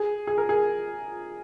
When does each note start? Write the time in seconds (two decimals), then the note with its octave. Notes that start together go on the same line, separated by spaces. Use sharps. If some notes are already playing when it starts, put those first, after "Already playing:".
Already playing: G#4
0.27 G#4
0.38 A#4
0.49 G#4